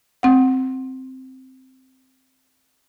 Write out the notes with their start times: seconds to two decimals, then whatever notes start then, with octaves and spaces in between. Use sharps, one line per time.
0.23 C4 F#5